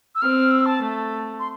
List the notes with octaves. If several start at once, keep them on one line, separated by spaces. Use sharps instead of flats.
E6
C4 F6
E6
A5
A3
C6